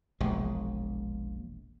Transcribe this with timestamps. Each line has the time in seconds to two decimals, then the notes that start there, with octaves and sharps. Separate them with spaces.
0.21 E1 A#1 G#3